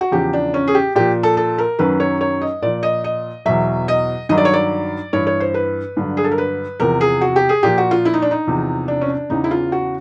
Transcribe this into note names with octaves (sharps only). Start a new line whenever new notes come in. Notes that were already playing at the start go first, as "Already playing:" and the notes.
F#4
E2 C#3 F3 G4
D4
C#4
G#4
G4
A#2 F3 G4
A4
A4
A#4
F#2 D#3 F#3 B4
C#5
C#5
D#5
A#2 F3 D5
D#5
D#5
E2 B2 F#3 E5
D#5
G2 D#3 F#3 D#5
D5
C#5
D5
G2 E3 C#5
C#5
C5
B4
G2 D3 F#3
G#4
A4
A#4
B4
E2 C3 F3 A#4
G#4
F#4
G4
G#4
A#2 F3 G4
F#4
F4
E4
D#4
D4
D#4
E2 C3 F3
D4
C#4
D4
E2 C#3 E3 D#4
E4
F4
F#4